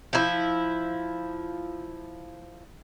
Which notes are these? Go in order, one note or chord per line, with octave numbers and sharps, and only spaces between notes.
F3 E4